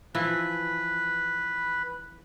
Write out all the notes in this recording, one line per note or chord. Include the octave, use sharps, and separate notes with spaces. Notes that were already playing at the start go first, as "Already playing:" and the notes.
E3 F3 E4 B4 B5